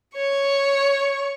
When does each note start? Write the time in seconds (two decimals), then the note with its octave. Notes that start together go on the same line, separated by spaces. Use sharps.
0.16 C#5 C#6